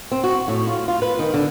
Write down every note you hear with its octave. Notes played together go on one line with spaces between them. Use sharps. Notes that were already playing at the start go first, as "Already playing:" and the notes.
C4
F#4
A2
F4
F4
B4
D#3
D3